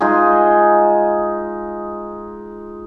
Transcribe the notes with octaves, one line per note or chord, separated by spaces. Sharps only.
G#3 D#4 F4 G#4